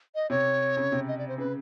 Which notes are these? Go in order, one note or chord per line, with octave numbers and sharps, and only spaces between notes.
D#5
C3 C#5
C#3
C3
D#5
D5
C5
C#3 B4